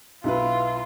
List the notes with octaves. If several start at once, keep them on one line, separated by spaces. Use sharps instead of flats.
B1 E4 F4 B4